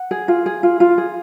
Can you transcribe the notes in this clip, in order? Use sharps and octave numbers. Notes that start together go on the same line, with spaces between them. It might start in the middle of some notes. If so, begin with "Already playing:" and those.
Already playing: F#5
G#4
F4
G#4
F4
F4
G#4